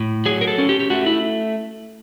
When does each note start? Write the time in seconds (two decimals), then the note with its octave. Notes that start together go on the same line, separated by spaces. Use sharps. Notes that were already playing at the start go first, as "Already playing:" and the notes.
Already playing: A2
0.26 F#3 G#4
0.41 A#4
0.47 A4
0.58 C#4
0.69 G4
0.80 G4
0.90 A3 F#4
1.06 E4